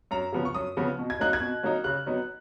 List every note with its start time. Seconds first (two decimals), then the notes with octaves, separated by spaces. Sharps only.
0.11 F#2 A#5
0.32 C#3 F3 B3
0.45 C#6
0.55 F#2 D#6
0.77 C#3 F3 B3
0.99 B2
1.10 G#6
1.19 F#3 A#3 D#4 F#6
1.33 G#6
1.41 B2
1.63 F#3 A#3 D#4
1.84 C#3 F#6
2.06 F#3 B3 D#4